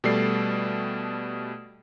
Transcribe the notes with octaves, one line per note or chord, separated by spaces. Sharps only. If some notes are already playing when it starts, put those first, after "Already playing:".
B2 G3 A3 A4 D5 C7